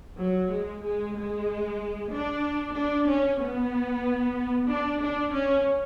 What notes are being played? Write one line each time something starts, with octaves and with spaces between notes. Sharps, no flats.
F#3
G#3
G#3
G#3
D4
D4
C#4
B3
D4
D4
C#4